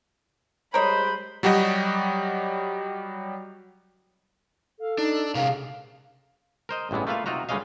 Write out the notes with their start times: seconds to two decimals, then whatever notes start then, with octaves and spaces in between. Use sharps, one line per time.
0.74 G3 G#3 A#4 C5 C#5 D#5 B5
1.43 F#3 G3 F#4 G4 D#5
4.80 A4 F5
4.98 D4 D#4
5.35 C3 C#4 G#4 A#4 F5
6.69 A#4 C5 D#5
6.91 A1 G2 E3 G#3 B3
7.07 A3 A#3 F4 B4 E5 F5
7.26 C3 D#4 F4 F#4 A#5
7.49 D2 G3 G#3 C#4 D#5 F5